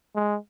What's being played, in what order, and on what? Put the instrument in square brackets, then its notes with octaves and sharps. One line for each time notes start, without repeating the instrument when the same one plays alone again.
[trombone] G#3